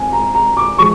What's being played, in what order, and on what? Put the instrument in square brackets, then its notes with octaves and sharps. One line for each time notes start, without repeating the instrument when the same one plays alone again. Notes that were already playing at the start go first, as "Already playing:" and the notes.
Already playing: [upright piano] C4 G#5
A#5
A#5
D6
F3 G#3 C#6